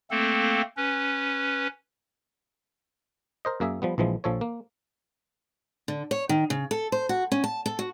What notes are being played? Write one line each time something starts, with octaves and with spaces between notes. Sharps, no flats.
A3 A#3 C4 A4
C#4 B4
A#4 C5 D#5
F#2 A#3 G#4 E5
F3 G3 B3
A#1 E3 F3 G#3
A#1 F3 A4 C#5
A#3
D3
C#5
D#3
C#3
A4
C5
F#4
C#4
A5
A4
F#4